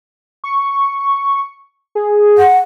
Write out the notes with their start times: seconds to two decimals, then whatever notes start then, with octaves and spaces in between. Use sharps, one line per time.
0.44 C#6
1.95 G#4
2.38 F#5